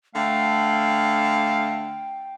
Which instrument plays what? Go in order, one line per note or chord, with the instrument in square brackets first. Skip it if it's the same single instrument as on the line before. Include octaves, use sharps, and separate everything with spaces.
[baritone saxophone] D3 [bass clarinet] A3 [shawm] F5 [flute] G5